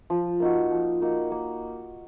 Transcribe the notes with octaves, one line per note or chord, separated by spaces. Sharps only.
F3
A#3 D#4 F#4
F3
A#3 D#4 F#4
A#3